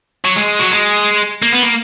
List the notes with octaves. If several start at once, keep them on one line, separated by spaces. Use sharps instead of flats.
F#3
G#3
F#3
G#3
A#3
B3
A#3